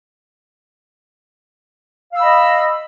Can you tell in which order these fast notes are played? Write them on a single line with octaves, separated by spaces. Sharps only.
F5 E6 B5 D#5